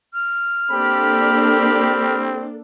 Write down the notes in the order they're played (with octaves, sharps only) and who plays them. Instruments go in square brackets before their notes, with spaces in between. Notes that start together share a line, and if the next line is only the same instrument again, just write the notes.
[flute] F6
[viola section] A#3 D4 A4 [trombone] C4 [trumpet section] G4 B5